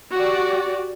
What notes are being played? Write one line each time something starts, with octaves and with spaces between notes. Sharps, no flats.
F#4 G4 D5